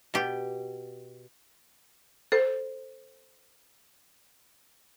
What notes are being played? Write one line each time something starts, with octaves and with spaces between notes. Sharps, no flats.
B2 G4
A4 C5